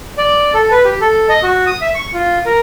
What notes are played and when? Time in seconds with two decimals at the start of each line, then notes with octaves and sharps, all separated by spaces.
0.18 D5
0.54 A4
0.71 B4
0.85 G4
1.01 A4
1.29 D#5
1.43 F#4
1.67 D#6
1.81 E5
1.95 C#6
2.13 F4
2.46 A#4